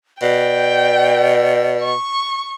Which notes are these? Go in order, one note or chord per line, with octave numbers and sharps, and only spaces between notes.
B2 D5 G5
C#6